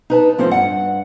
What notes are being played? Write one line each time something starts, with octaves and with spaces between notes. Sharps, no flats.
D#4 B4 A5
A2 F3 C4 C#4 A4 C5
G2 F#5